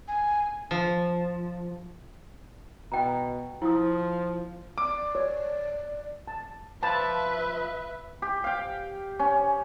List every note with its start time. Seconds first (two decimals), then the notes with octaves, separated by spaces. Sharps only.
0.08 G#5
0.71 F3
2.92 B2 G5 A#5
3.62 F3 E4 D#6
4.78 D5 D6
5.15 C#5
6.28 A5
6.83 F3 B4 E5 A5 B5
8.22 G4
8.44 F5 G5
9.19 C#4